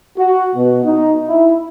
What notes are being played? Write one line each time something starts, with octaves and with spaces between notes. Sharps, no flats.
F#4
B2
D#4
E4